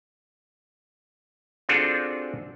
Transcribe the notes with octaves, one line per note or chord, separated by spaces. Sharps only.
C4 D4 F4 F#4 G#4 A4